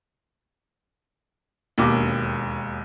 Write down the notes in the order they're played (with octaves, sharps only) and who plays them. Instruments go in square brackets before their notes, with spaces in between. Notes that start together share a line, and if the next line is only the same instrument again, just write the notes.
[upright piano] E1 D#2 B2 D6